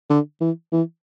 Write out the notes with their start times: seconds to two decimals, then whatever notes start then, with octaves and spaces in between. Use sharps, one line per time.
0.10 D3
0.41 E3
0.72 E3